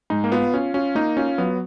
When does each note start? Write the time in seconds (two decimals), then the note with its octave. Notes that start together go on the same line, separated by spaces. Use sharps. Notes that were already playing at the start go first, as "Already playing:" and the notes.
0.10 G#2 D#4
0.24 A#3
0.32 B3 F4
0.54 C#4 F4
0.74 C#4 F4
0.95 A#3 D#4
1.17 C#4 F4
1.38 F#3 B3